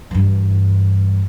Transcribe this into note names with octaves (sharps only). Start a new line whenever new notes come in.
G2 E3